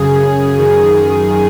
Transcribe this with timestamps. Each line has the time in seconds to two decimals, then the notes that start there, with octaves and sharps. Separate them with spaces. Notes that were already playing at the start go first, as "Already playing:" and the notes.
Already playing: F#2 C#3 G#4
0.57 F#2 D#3